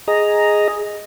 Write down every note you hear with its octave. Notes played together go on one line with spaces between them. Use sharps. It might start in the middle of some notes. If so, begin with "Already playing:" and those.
G#4 D#5 A#5